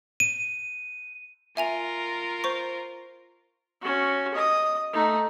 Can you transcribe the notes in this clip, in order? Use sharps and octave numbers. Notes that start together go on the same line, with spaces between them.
D#7
F4 A#4 E5 G#5 F7
C5 C#6
C#4 F#4
D#5 D#6
A3 D#4